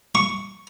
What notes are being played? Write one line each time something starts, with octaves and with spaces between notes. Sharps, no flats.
C#6